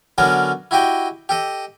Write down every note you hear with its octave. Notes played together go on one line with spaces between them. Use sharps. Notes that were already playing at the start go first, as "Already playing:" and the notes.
D3 F#3 B3 C#4 D4 A#4
E4 F#4 G4 D#5 G5
G4 A4 D#5